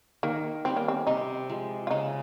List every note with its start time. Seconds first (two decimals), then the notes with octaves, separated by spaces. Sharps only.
0.23 D#3 A#3
0.65 G3 C4 C#4
0.77 A#3
0.88 C4
1.07 C3 D#4
1.49 F3 G#3
1.87 F4
1.91 C#3 D#4